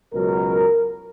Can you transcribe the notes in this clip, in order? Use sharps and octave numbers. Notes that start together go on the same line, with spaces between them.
C#2 B2 F#3 A#4